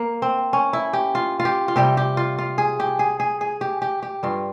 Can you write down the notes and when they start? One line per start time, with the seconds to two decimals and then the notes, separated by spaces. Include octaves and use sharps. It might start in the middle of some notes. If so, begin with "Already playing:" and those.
Already playing: A#3
0.22 C4
0.53 C#4
0.73 E4
0.93 G4
1.15 F4
1.40 F4
1.45 G4
1.68 F4
1.76 C3 G3 G4
1.97 G4
2.17 F4
2.38 F4
2.58 G#4
2.80 G4
2.99 G#4
3.20 G#4
3.41 G#4
3.61 G4
3.82 G4
4.03 G4
4.23 G2 G3 F4